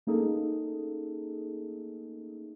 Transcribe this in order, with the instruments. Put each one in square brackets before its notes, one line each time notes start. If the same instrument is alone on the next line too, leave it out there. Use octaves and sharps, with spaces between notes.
[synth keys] A3 A#3 C#4 D#4 G#4 A4